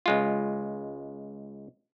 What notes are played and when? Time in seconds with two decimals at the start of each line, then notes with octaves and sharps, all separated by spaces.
0.06 C#2 G#3 F4